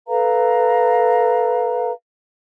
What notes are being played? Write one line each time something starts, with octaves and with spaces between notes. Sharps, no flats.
A4 B4 F5 A#5